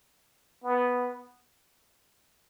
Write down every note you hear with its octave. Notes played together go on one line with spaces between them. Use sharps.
B3